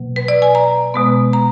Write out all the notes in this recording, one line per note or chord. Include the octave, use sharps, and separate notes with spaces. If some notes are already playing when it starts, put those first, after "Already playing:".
Already playing: B2 F#3 A#3
B4
D5
G#5
A#5
B2 G#3 B3
A#5